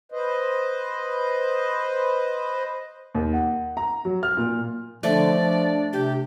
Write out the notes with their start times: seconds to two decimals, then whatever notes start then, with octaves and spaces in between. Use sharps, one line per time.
0.12 B4 C5 D#5
3.15 D#2
3.33 F#5
3.77 A#5
4.05 F#3
4.23 F6
4.37 A#2
5.03 D3 F3 A3 D5
5.34 D4
5.93 C3 G4